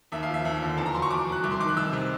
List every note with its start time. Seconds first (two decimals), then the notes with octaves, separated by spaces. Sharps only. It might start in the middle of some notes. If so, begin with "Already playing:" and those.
0.12 D#2 E5
0.23 F5
0.28 F3
0.34 E5
0.45 D#2
0.62 D3
0.78 E2 A5
0.86 A#5
0.95 F#3 C6
1.02 C#6
1.10 E2 D6
1.27 B2
1.32 F#6
1.43 C2 D6
1.52 C6
1.60 D#3 D6
1.69 F#6
1.77 C2 E6
1.93 C3